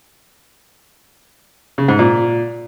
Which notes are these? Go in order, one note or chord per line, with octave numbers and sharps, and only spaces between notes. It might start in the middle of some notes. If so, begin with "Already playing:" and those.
C#3
G#2
A#2